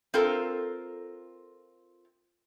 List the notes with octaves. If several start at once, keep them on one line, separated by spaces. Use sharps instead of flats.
C4 F4 A4 A#4